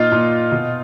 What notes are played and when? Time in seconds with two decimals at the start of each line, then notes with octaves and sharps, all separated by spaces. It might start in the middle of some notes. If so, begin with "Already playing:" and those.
Already playing: A#2 D#4 F4
0.12 A#2
0.52 B2